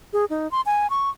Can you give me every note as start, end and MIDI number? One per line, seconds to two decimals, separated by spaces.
0.13 0.25 68
0.30 0.50 63
0.51 0.61 84
0.66 0.90 80
0.90 1.10 85